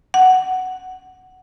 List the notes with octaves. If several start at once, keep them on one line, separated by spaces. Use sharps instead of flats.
F#5